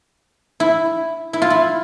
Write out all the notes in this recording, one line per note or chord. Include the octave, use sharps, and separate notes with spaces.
E4
E4
F4
E4